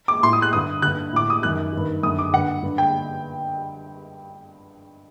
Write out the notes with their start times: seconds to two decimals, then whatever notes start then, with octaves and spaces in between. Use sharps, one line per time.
0.08 D6
0.23 A2 C6
0.33 D#6
0.42 F#6
0.53 G2 D3 D#6
0.82 G2 D3 F#6
1.13 A2 D6
1.30 D#6
1.42 F#2 D#3 F#6
1.73 G2 D#3
2.03 F#2 D3 D#6
2.18 D6
2.33 G2 D3 F#5
2.63 G2 D3
2.78 G5